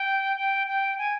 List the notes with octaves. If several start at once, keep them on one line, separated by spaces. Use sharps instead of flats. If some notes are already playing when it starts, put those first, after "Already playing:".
Already playing: G5
G5
G5
G#5